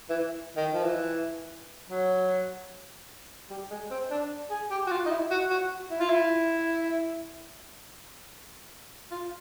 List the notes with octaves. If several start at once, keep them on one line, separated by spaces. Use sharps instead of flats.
E3
D#3
F3
E3
F#3
G3
G#3
C4
D4
G#4
G4
F#4
F4
D#4
E4
F#4
F#4
E4
F4
E4
F4